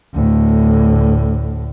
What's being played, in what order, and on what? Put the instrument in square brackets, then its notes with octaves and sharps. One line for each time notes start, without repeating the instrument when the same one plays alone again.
[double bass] D2 A2